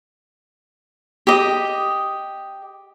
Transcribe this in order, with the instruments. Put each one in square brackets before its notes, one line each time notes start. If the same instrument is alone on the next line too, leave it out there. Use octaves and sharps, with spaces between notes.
[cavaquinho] G4 D#5